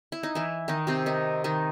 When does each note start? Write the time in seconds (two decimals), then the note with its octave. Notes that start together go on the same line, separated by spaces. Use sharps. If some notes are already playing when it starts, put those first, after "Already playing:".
0.12 E4
0.23 D#4
0.35 E3 E4
0.68 D#3 D#4
0.87 C3 C4
1.06 D#3 D#4
1.44 D#3 D#4